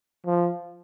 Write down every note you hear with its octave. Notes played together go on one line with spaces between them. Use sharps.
F3